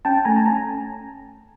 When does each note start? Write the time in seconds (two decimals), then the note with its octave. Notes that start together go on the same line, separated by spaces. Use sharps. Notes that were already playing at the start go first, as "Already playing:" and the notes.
0.05 C#4 G5 A5
0.25 A3 G#5 A#5
0.36 A5
0.46 C#4 G#5 A#5